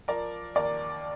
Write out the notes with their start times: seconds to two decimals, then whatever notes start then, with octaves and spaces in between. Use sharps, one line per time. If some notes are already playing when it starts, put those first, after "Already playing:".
0.08 F3 A#4 D5
0.55 D#2 A#4 D5